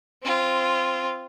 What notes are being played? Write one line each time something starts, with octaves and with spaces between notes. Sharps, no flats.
C4 F4